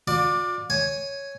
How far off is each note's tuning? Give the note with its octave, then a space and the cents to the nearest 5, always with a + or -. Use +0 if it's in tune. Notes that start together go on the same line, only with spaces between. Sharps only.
F4 +45 D5 +10 D6 +0
C#5 +0 G#5 +0